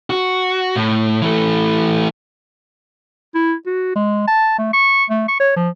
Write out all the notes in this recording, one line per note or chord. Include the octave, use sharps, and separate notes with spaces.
F#4
A2
E3 A3
E4
F#4
G#3
A5
A3
C#6
A3
C#6
C#5
F3